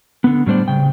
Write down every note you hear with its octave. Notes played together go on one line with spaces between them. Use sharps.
D3 B3
A2 G3 D4 C5 D5
C#3 G5